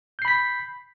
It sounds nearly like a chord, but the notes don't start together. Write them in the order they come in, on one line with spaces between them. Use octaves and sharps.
G6 C7 B5 B6